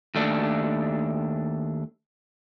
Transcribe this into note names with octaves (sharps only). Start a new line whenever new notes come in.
D#2 A3 D4